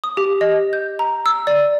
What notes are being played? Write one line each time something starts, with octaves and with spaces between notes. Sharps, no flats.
D#6
G4
D#5
G6
A#5
E6
D5